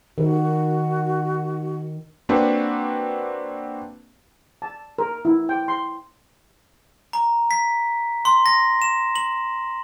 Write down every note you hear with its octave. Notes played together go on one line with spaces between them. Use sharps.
D#3 F#4
A#3 C4 D4 F#4 B4
A5
A#4
E4
G5
C6
A#5
B6
C6
A#6
E7
F#7